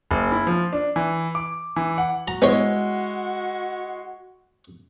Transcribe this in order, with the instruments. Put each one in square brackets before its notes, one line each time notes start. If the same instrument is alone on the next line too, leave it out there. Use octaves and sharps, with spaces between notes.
[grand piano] F#1
E4
F3
D4
E3
D6
E3
F#5
[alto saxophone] F#4 [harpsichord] A#5
[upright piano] G#3 E4 [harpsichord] B3 C#5